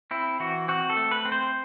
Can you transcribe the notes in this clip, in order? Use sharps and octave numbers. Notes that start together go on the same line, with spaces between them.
C4 E4
E3 F#4
C4 F#4
A4
A3
B4
C4
C5